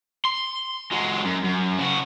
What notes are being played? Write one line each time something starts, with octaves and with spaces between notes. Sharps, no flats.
C6
F#3 G#3
F#2
F#2
C#3 F#4